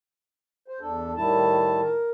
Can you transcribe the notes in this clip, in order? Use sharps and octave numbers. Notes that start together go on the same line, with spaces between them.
C5
E2 D4 A4
A2 D#3 G3 E4 A5
A#4